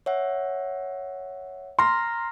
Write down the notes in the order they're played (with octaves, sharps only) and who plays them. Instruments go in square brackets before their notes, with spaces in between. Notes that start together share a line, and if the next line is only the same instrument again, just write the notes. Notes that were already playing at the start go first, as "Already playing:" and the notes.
[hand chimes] C#5 E5 F#5
[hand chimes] A#5 F6 A#6 [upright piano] C6